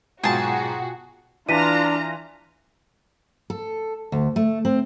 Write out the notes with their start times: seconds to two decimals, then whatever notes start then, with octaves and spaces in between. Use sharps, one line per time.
0.23 G#2 B2 F#3 F4 F#4 G#4 G5 A5
1.49 E3 D4 F4 A#5 B6 D#7
3.50 A4
4.12 D2
4.36 A3
4.65 C4